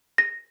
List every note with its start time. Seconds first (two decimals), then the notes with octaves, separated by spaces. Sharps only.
0.18 A#6